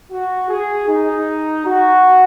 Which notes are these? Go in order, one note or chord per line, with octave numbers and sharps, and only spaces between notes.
F#4
G#4
D#4
F#4